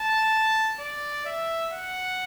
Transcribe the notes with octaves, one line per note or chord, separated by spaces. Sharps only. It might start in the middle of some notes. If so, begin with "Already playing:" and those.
Already playing: A5
D5
E5
F#5